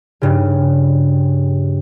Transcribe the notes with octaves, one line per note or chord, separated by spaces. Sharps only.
G2 C#3